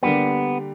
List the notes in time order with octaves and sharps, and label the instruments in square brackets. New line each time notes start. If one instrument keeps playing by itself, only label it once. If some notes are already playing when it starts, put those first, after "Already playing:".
[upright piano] D3 G3 A#3 D4 G4 [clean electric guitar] B3